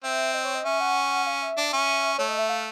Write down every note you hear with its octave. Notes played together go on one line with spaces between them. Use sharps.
C4 E5
D#5
C#5
D#5
C#4 E5
F#5
F5
E5
D4
C#4
A3 C#5
D#5
E5
F5